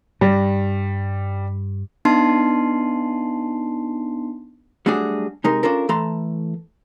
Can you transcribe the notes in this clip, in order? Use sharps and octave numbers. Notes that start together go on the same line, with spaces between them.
G2 G3
B3 D4 D#4 A5 C6 C7
F#3 G3 A3 D4 F#4 G#4
C3 G#3 D#4 A#4
C#4 D4 F4 A4 A#4
E3 A3 A4 A#5 C6